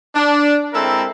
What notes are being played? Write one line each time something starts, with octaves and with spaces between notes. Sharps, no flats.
D4
G#3 C4 E4 A4 A#4 E5